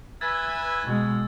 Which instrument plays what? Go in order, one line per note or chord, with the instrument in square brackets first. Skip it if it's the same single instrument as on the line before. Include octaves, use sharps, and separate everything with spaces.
[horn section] B4 E5 G#5 [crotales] E6 G#6 A6
[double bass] B2 G#3